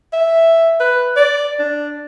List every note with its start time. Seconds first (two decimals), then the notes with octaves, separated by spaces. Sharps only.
0.13 E5
0.80 B4
1.17 D5
1.59 D4